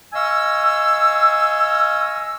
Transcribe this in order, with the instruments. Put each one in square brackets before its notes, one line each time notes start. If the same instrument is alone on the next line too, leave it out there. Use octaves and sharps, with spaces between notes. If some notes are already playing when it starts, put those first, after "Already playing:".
[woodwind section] D#5 F5 G#5 C#6 E6